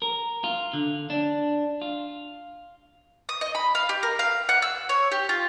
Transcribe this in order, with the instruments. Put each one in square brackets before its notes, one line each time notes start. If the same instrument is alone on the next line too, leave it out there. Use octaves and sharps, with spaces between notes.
[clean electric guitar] A#4
F4
D3
D4
F4
[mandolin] D#6
D#5
B5
F5
G4
A#4
F5
F#5
E6
C#5
G4
F4